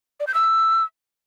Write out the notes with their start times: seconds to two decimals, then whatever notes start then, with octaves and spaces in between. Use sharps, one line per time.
0.20 D5
0.27 G6
0.34 E6